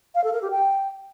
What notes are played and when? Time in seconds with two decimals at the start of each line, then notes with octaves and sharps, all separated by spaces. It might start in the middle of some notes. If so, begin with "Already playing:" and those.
0.15 F5
0.24 A4
0.33 A#4
0.42 G4
0.51 G5